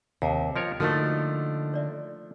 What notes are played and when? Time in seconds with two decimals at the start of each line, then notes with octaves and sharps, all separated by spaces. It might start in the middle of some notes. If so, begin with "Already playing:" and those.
0.22 D#2 C3 F5 A5 A#5
0.56 F3 A#4 C#5 D#5
0.80 D3 F3 A3 A#3 D#4 F#4 A4 A#4
1.74 C#5 D5 E5